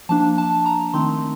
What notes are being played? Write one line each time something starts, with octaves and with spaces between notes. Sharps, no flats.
F3 A#3 D4 A5
A5
A#5
D#3 A3 C4 D#4 C6